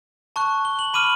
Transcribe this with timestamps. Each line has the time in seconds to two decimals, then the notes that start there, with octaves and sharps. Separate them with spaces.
0.36 A5 C#6 F#6
0.65 G7
0.79 F#7
0.94 B5 D6 F6 D#7